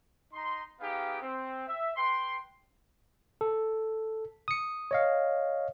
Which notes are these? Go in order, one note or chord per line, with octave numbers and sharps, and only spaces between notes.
D#4 A#5 C6
B3 D#4 G4 G#4 F5
C4
E5
B4 G5 C6
A4
D#6 C#7
C#5 D#5 F5